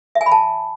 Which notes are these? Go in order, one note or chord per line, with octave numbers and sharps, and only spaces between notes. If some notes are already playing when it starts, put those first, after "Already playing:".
E5
G#5
B5
A5